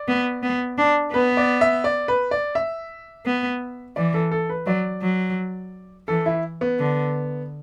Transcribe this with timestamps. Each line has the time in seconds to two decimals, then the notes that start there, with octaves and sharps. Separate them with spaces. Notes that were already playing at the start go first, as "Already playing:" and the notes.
Already playing: D5
0.08 B3
0.43 B3
0.78 D4
1.13 B3 B4
1.37 D5
1.61 E5
1.84 D5
2.08 B4
2.31 D5
2.55 E5
3.26 B3
3.96 E3 D5
4.14 A4
4.32 A4
4.49 B4
4.66 F#3 D5
5.02 F#3
6.08 E3 A4
6.26 E4
6.61 B3
6.79 D3